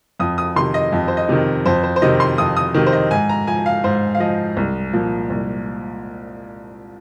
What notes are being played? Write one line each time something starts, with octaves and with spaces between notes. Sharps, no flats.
F2 D#6
D#6
C3 D#3 C6
D#5
F2
C5
D#5
C3 D#3
F2 C5
C5
C5
C3 D#3 D#5
C6
F2 D#6
D#6
C3 D#3
C5
D#5
G#2 G#5
A#5
F3 G#5
F5
G#2 C5
F5
F3 D#5
C2
A#2 F3
C2